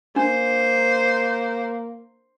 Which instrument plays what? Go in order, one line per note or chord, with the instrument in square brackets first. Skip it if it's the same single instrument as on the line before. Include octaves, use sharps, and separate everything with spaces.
[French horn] A#3 [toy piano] D4 [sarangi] C5